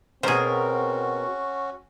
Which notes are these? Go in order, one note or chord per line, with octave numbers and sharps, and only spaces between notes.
B2 C4 C#4 F#4 G#4 A#4 C5